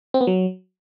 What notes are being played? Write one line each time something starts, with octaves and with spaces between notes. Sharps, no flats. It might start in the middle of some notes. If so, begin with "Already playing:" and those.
C4
B3
F#3